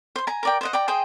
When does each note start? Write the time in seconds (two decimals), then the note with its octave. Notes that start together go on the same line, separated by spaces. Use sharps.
0.16 C5 C6
0.27 G#5 A#5
0.43 A#4 D5 G5
0.61 C5 D#5 F#5
0.73 D5 G5 A#5
0.88 G#4 C5 D#5 G5